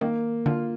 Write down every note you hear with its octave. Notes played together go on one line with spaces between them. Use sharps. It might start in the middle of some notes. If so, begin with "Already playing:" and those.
D#3 A#3
D3 F4